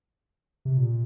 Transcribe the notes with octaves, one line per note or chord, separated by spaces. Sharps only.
C3
A#2